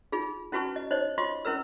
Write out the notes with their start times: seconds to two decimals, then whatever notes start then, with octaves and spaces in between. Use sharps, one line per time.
0.12 D#4 F4 G#4
0.52 C#4 E4 F#4 B4 A5 C#6
0.76 D#5
0.91 D#4 C5 C#5 D#5
1.18 F4 D#5 C6 C#6
1.45 C#4 E4 A#4 B4 E6